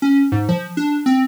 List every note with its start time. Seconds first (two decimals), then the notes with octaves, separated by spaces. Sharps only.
0.02 C#4
0.32 G#2
0.49 F3
0.77 D4
1.06 C4